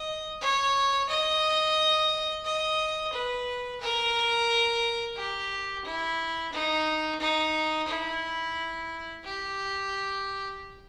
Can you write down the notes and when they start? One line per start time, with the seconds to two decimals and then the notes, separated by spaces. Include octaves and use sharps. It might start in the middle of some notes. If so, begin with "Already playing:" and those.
Already playing: D#5
0.41 C#5
1.09 D#5
2.45 D#5
3.13 B4
3.81 A#4
5.16 G4
5.85 E4
6.52 D#4
7.20 D#4
7.88 E4
9.24 G4